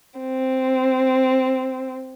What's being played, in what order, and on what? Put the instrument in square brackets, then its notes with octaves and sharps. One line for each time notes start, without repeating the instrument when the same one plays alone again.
[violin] C4